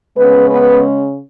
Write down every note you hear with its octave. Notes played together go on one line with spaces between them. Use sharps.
C#3 G#3 B3 C#4 B4
B3 B4